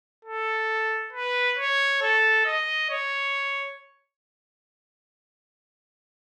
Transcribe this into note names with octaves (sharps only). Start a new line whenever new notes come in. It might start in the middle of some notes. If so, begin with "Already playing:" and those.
A4
B4
C#5
A4
D#5
C#5